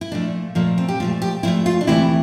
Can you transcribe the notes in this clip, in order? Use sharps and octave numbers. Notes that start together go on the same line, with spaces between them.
E4
A#2 F3 A3 D4
A#2 F3 A3 A#3
C4
G4
A#2 F3 A3 F4
G4
A#2 F3 A3 E4
F4
D4
D2 C3 E3 A3 E4